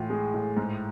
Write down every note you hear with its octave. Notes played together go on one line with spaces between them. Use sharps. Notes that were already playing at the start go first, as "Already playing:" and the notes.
Already playing: A2 E3 F4
G#3
A2
G#2